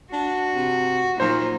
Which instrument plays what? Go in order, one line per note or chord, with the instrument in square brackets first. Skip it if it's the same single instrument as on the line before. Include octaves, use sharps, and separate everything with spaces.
[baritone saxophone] D4 [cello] F#4
[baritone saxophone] C3
[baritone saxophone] A#2 [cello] F#3 D#4 [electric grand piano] C5